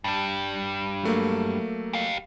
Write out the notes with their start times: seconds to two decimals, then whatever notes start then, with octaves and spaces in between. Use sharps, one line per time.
0.04 G2 G3 A5
1.03 F#3 A3 A#3
1.93 G4 F5